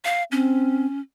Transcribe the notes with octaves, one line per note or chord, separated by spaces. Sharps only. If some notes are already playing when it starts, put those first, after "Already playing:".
F5
C4 C#4